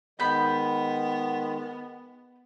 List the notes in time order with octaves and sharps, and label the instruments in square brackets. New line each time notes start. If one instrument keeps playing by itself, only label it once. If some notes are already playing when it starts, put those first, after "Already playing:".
[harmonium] D#3 G#3 [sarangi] B3 [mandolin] B5 G6